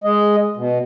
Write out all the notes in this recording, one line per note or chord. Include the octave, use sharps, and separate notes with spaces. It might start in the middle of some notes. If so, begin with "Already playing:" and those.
G#3 D#5
B2